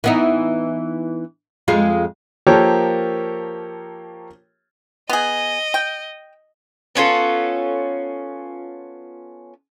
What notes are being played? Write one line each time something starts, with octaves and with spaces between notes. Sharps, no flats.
E3 B3 D#4
F2 G#3 F4
F3 A#3 G4 A4 A#4 C#5
B3 G#4 D#5
G5
B3 C#4 F4 A4